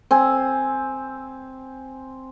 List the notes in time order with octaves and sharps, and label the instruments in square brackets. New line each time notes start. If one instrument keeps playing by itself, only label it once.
[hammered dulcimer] C4 G#5